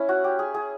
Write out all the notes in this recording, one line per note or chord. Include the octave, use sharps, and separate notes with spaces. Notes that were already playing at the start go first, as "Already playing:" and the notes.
Already playing: C#4 E4
F#4
G4
G#4
G#4